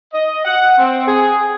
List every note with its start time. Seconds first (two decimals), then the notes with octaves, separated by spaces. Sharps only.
0.13 D#5
0.45 F#5
0.78 C4
1.07 G#4